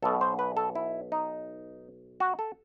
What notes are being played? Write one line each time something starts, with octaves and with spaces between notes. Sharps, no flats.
B1 B2 A4
C5
B4
A4
E4
D#4
F#4
A4